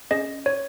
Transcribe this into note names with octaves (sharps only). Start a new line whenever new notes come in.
C#4 G#4 D#5
C#5